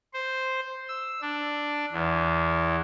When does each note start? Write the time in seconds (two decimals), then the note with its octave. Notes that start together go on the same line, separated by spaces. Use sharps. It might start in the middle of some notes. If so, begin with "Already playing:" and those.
0.13 C5
0.88 E6
1.21 D4
1.92 E2